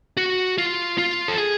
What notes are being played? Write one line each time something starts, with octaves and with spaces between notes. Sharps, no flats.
F#4
F4
F4
A4
G#4